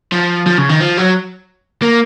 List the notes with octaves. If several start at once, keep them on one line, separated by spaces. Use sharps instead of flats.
F3
F3
C#3
D#3
F3
F#3
A#3